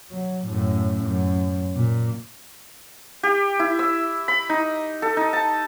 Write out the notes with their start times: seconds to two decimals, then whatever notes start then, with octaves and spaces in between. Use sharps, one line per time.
0.11 F#3
0.46 F#2 A2
1.04 F#2
1.75 A#2
3.23 G4
3.59 E4
3.79 E6
4.28 B5
4.49 D#4
5.02 A4
5.17 D#4
5.33 A5